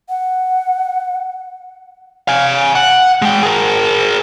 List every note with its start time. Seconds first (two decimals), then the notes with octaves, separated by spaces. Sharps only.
0.09 F#5
2.28 F5 G#5
2.75 F#5
3.22 G#3 G5
3.43 G#4 A#4